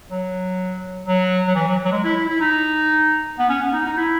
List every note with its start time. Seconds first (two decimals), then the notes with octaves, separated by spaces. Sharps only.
0.11 F#3
1.07 F#3
1.47 F#3
1.56 E3
1.68 F#3
1.85 F#3
1.92 G#3
2.04 E4
2.16 E4
2.29 E4
2.41 D#4
3.39 B3
3.49 C#4
3.62 B3
3.73 D#4
3.86 D#4
3.98 E4